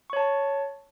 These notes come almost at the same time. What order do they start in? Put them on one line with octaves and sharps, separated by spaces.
C#6 C#5 A5